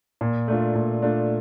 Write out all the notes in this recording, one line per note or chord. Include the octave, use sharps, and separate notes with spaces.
A#2
A3 D4 F4
A#2
A3 D4 F4